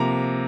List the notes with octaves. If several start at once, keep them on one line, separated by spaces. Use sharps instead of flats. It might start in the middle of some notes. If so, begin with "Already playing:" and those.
Already playing: C3 F3 A#3 A#5